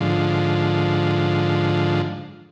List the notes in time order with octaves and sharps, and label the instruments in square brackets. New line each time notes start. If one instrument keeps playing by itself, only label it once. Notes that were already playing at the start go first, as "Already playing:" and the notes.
[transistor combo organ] G#2 D3 F3